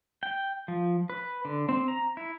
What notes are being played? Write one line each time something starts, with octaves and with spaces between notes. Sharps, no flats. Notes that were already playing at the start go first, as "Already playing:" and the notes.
G5
F3
B4
D3
C4
A#5
E4